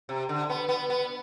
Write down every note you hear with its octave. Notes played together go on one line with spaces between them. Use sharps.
C3
D3
B3
B3
B3